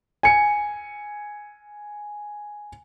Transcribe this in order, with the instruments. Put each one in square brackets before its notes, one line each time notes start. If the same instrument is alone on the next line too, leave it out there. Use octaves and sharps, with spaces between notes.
[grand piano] G#5 C#7